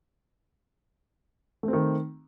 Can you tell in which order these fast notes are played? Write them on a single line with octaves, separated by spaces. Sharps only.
A3 C4 D#3